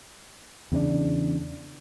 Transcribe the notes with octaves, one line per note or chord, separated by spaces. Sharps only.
E2 C#3 C4 D4